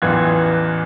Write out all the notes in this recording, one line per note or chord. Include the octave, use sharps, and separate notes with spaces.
A1 E2 E3 F4 F#6 G#6